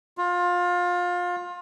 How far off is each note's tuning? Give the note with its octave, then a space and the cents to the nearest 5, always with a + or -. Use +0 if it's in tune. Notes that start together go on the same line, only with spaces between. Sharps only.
F4 +25